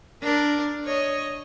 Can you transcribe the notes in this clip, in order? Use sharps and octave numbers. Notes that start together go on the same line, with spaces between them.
D4 A#4
C#5 D#5